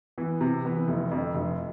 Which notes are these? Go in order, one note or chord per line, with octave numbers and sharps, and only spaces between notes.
E3 B3
C3
E3 B3
F1
F2 D3
F1